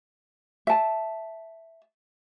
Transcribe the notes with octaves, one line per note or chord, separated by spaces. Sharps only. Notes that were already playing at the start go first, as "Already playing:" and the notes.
E5 A5